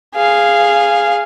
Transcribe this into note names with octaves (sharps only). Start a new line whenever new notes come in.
G#4 F5